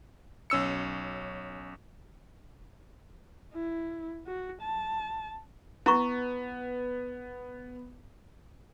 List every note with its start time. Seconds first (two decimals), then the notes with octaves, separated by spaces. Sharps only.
0.50 B1 C#4 E6 C#7
3.54 E4
4.27 F#4
4.61 A5
5.86 B3 E4 A#5 C#6